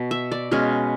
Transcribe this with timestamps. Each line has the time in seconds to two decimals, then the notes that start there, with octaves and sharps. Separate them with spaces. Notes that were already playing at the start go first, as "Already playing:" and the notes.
Already playing: B2
0.11 E5
0.32 D5
0.51 B2 G#3 C#4 F5